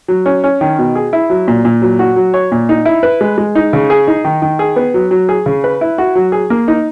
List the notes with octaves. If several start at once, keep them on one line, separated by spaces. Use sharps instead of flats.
F#3
C#4
C#4
D#3
B2
G#4
E4
F#3
A#2
A#2
F#3
F#4
F#3
C#5
A#2
D#4
E4
B4
G#3
G#3
D#4
C#3
G#4
D#4
D#3
D#3
G#4
B3
F#3
F#3
G#4
C#3
B4
E4
F#4
F#3
G#4
A#3
D#4